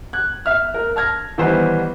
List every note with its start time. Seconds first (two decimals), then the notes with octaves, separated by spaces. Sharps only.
0.13 F#6 G#6
0.46 E5 F6
0.74 A#4
0.96 A5 F6 G#6 A#6
1.38 D#3 E3 G3 B3 C5